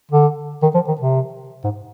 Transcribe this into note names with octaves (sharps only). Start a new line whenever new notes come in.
D3
D#3
F3
D#3
C3
G#2